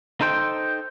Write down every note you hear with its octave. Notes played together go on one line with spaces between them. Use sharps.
D#4 A4 C5 G5